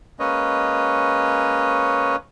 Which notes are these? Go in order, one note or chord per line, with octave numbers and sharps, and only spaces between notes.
G#3 A#3 C#4 B4 C#5 D#5